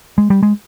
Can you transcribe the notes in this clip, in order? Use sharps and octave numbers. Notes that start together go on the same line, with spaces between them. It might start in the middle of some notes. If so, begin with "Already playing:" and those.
G#3
G3
G#3